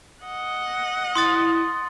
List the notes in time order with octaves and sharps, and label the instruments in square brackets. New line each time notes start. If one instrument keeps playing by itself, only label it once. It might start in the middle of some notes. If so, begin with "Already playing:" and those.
[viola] D#5 F#5
[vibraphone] E4 [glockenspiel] C6 D#6 A6